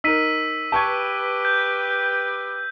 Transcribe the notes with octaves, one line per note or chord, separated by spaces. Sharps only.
D#4 A#4 E6 B6 D#7
G4 B4 A5 C#6 G#6
G6